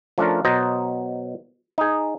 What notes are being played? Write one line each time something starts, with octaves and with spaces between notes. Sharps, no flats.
F3 A3 C#4 D4 F4 A#4
B2 F#3 C5 D#5 A#5
D#4 G#4